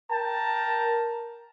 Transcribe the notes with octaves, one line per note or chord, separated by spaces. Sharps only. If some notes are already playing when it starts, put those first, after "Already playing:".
A#4 G5 A5 A#5